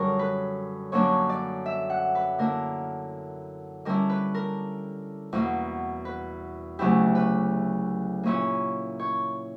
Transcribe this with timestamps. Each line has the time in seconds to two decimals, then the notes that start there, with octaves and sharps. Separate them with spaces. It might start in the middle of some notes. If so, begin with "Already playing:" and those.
Already playing: F#2 D3 G3 A#4 C#5
0.19 B4
0.92 F#2 D3 A#3 D4 C#5
1.30 D5
1.66 E5
1.90 F#5
2.15 B4
2.39 D3 A#3 E4 A#4
3.85 D3 G3 C#4 E4 A#4
4.09 B4
4.35 A#4
5.33 E2 B2 A#3
6.05 B4
6.79 D2 C#3 F#3 B3 E4 G4
7.15 B4
8.23 A#2 A#3 C#4 E4 C#5
9.00 C#5